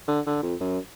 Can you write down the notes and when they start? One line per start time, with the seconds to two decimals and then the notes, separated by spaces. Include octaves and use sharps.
0.08 D3
0.26 D3
0.43 F2
0.60 F#2